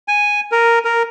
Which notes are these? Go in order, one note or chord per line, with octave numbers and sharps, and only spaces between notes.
G#5
A#4
A#4